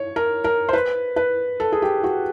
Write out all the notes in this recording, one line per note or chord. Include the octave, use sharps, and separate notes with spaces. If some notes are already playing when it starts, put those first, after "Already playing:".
Already playing: C#5
A#4
A#4
C5
B4
B4
A4
G#4
G4
F#4